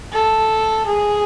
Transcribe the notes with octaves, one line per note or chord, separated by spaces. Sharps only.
A4
G#4